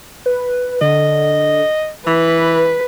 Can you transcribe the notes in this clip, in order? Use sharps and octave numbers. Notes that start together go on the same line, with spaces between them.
B4
D3 D#5
E3 B4 B6